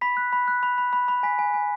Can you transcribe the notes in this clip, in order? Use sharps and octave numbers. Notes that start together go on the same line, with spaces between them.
B5 B6
F#6
B5
F#6
B5
B5
B5
B5
G#5 B6
G#5
G#5